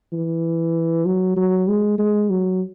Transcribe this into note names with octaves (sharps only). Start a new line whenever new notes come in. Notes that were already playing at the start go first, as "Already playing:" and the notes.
E3
F#3
F#3
G#3
G#3
F#3